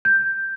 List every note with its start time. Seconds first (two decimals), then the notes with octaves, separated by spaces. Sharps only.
0.05 G6